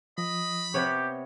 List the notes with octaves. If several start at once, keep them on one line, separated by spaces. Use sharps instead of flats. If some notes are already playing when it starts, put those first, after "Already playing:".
F3 D#5 B5
C3 B3 G4 C#5